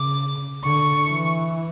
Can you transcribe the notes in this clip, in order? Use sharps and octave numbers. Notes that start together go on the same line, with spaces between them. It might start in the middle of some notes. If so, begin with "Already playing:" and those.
Already playing: C#3 D6
D3 C#6
E3